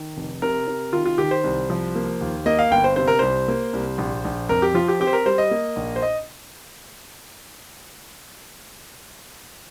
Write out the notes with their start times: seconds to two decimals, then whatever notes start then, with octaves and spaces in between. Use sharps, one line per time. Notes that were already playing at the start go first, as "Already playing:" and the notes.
Already playing: D#3
0.17 F1
0.42 C3 A#4
0.67 C3
0.93 D#3 F4
1.06 F4
1.18 D#3 G4
1.31 C5
1.44 C2
1.70 F3
1.95 A#3
2.21 D#2
2.46 A#3 D#5
2.59 F5
2.71 G1 G5
2.84 C5
2.96 C3 C5
3.08 A#4
3.19 C2 C5
3.48 A#3
3.73 C2
3.98 A#1
4.25 A#1
4.49 F2 A#4
4.62 G4
4.74 F3 F4
4.88 G4
5.00 C4 G4
5.07 C5
5.13 A#4
5.26 G3 C5
5.38 D#5
5.51 A#3
5.76 A#1
5.96 C5
6.02 D#5